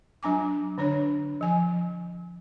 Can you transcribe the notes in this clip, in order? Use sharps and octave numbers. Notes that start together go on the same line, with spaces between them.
F#3 D4 G#5 D6
D3 D4 C#5
F3 G#5